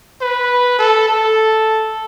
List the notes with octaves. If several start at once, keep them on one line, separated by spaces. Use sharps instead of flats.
B4
A4
A4